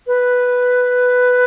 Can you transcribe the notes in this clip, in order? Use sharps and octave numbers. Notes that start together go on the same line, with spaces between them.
B4